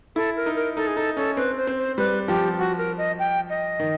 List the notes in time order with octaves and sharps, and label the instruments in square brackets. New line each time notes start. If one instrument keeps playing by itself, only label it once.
[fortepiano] E4 [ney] A4
[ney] A#4
[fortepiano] D#4
[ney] A#4
[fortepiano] D#4 [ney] A4
[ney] G#4
[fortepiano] D#4 [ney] A4
[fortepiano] C#4 [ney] A4
[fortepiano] C4 [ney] B4
[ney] C5
[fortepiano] C4
[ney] C5
[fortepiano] G3 [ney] B4
[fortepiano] F3 [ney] G4
[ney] F#4
A#4
D#5
G5
D#5
[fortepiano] D#3